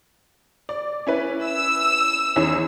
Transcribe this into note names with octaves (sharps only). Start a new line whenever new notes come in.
D5
C#4 E4 B4
E6
E2 C#4 D#4